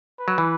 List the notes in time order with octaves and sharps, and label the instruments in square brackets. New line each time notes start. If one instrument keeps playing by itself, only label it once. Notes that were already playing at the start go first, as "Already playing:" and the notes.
[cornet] B4
[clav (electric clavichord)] F#3
E3